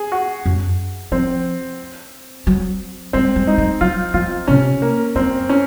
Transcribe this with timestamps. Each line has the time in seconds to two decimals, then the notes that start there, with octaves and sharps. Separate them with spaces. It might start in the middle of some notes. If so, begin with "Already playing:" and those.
Already playing: G#4
0.12 F#4
0.45 F#2
1.12 F3 C4
2.47 F#3
3.13 G#3 C4
3.36 G#3
3.47 D#4
3.58 G#3
3.81 F#3 F4
4.14 F3 F4
4.48 C3 C#4
4.82 A#3
5.15 F#2 C4
5.49 C#4